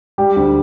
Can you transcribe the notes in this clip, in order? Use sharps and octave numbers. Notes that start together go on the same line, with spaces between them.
G3 G4
D2